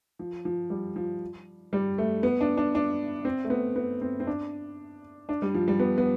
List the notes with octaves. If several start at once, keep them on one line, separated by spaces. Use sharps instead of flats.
F3
F3
G3
F3
G3
A3
B3
D4
D4
D4
C4
A3
B3
B3
C4
C4
D4
D4
G3
F3
G3
B3
B3